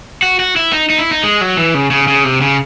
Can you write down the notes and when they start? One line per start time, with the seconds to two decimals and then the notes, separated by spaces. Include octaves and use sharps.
0.22 F#4
0.40 F#4
0.56 E4
0.73 D#4
0.90 D#4
0.98 E4
1.11 D#4
1.23 G#3
1.41 F#3
1.57 E3
1.74 C#3
1.91 C#3
2.08 C#3
2.25 C3
2.41 C#3